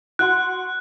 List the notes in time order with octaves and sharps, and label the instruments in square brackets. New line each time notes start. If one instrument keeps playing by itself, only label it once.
[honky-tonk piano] F#4 F#5 C6 [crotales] F#6